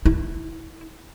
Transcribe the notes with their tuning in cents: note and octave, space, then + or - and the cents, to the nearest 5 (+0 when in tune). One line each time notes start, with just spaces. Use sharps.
E4 -15